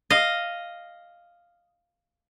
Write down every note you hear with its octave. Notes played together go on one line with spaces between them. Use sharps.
D#5 F5